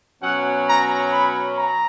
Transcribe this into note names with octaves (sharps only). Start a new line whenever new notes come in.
B2 F#3 C#4 F#5
A#5
B5
A#5